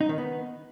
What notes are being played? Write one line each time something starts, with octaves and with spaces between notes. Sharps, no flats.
D#4
D#3
B3